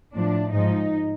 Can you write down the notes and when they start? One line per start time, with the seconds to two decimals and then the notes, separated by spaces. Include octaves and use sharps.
0.14 A2 F3 D4
0.53 G#2 F3 D#4